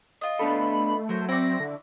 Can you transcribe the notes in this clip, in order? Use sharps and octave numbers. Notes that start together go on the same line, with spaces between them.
F4 D#5
A3 B3 D4 A4 B5
F#3 A#4 C5
C4 E4 F#4 D5 A#6
D3